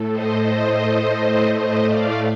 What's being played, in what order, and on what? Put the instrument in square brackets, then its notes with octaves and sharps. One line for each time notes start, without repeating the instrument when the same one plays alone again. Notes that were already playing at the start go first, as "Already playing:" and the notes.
Already playing: [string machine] A2 A3
C5 D#5
C5 D#5
C5 D#5
D5 F5